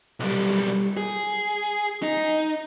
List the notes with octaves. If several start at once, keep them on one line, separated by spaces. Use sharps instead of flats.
B1 G3
G#4
D#4